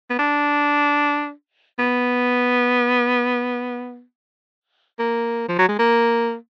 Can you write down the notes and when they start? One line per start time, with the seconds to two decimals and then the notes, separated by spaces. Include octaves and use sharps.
0.10 B3
0.19 D4
1.79 B3
4.99 A#3
5.48 F3
5.58 F#3
5.69 G#3
5.79 A#3